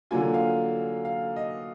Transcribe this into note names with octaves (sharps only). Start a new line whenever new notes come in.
D3 F#3 A#3 F4 G#5
F5
F5
D#5